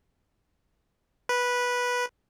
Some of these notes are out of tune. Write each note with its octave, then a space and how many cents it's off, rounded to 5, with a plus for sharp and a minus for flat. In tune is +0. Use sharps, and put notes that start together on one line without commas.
B4 -10